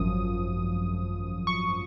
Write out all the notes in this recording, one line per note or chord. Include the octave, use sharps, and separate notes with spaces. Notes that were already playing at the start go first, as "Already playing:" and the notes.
Already playing: G#1 F#2 F3 D#6
C#6